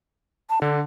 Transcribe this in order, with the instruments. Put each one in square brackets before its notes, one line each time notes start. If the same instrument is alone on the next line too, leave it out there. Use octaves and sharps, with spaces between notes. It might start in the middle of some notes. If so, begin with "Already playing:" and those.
[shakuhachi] A5
[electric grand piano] D3 [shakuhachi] D4